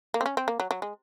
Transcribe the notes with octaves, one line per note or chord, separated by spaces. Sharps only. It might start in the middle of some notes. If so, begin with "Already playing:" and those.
A#3
C4
C#4
C4
A#3
F#3
F#3
G#3